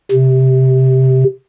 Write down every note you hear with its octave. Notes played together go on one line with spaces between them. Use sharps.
C3